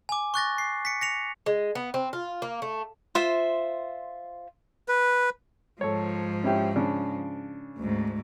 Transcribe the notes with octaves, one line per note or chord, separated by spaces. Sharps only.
G#5 D6
C#6 F#6 A6 A#6
C7
B6 C#7
A#6 C#7 F7
G#3
B3
C4
F4
A#3
A3
F4 C5 E5
B4
G#2 F3 A4 C#5
C#4 E4 G4
C#3 D4
D2 G#2